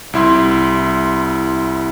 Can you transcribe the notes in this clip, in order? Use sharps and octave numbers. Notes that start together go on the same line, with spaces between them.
C2 E4 C6